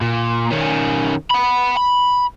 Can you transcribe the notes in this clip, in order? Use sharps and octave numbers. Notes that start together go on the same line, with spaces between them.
A#2
D#3 C#4
F#5 B5
B5